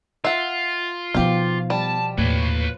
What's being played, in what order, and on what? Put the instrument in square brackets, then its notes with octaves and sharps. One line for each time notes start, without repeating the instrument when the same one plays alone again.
[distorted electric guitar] F4 [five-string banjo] E5 F#5
[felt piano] B2 F3 [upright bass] B3 D#4 [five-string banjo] G4 F5
[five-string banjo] G3 [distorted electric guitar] A5
[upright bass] D#2 A2 [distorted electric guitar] B4 C#5